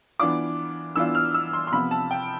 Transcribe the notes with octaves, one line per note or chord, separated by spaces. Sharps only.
E3 B3 D4 F4 D6
E3 B3 D4 F4 E6
F6
E6
C6
C6
C3 F3 B3 B5
A5
G5